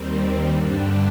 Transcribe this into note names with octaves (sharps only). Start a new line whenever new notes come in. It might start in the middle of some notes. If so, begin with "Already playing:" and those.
Already playing: D#2 D#3 G3 C4
G2 D3 G3 D4